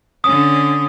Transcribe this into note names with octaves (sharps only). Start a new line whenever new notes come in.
D3 C#4 D#6